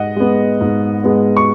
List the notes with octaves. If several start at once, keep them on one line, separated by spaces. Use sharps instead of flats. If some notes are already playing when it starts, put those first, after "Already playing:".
Already playing: G#2 D#5 F#5
G#3 B3
G#2
G#3 B3
C#6